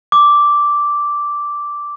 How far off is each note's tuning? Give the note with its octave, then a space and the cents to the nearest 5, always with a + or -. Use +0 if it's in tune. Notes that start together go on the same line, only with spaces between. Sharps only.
D6 -5